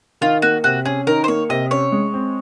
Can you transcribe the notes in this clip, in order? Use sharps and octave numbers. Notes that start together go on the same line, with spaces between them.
D#3 F4
A#3 F#4
C3 F#4
C#4 G#4
D#3 A#4
C5
A#3 C#5
C3 D#5
C#4 C#5
G#3
C4